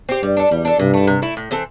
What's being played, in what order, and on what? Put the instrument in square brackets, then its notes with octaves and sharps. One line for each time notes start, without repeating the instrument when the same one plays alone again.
[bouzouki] C4 G4
[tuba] G2 [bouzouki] G3
[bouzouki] D4 A4
[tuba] E2 [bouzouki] G3
[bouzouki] D4 A4
[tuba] G2 [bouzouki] C3
[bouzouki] A3 E4
C3
A3 E4
A2
E3 C4 A4